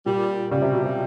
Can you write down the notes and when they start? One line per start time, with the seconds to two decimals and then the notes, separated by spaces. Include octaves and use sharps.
0.06 A#2 G3
0.51 C#3 G3
0.62 C3
0.73 B2
0.84 C3